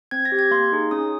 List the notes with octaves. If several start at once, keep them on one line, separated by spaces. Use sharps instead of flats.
C4 G#6
A#6
G4
G#6
A#3 C6
D#4 G#4
C#4 D#6